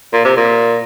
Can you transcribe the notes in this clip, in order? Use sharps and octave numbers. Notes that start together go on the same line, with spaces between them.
A#2
C3
A#2